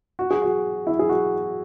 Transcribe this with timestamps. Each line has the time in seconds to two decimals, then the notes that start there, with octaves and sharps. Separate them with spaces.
0.19 F#4
0.31 G#4
0.42 F#4
0.87 E4
0.99 G#4
1.09 F#4